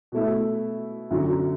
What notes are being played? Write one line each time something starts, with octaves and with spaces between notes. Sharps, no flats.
B2 A3 E4
F#2 D3 F#3